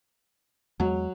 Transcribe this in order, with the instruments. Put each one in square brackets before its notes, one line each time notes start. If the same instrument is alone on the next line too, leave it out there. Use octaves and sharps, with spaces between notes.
[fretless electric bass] E2 G#3 [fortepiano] F#3